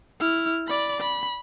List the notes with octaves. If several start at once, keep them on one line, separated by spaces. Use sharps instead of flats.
E4 F6
D5 B5
B5